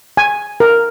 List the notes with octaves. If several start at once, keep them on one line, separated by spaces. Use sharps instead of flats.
G#5
A#4